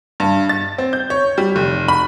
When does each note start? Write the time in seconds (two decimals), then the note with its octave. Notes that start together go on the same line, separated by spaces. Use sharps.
0.20 G2
0.49 A6
0.78 C4
0.93 G6
1.10 C#5
1.38 G3
1.56 F1
1.88 B5